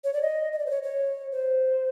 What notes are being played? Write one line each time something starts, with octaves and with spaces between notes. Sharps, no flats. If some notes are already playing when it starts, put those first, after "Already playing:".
C#5
D5
D#5
D#5
D5
C5
C#5
C#5
C5